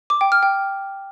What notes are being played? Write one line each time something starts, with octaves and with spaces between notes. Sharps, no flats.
D6
G5
F6
G5